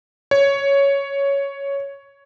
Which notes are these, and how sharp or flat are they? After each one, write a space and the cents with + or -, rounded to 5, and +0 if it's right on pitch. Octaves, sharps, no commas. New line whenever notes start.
C#5 +5